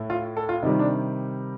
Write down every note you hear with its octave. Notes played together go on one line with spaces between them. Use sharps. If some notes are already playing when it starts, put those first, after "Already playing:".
Already playing: A2 A3
F4
A4
F4
C3 D#3 G3 D#4
D4